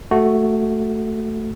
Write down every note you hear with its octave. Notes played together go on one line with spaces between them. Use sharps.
A3 F#4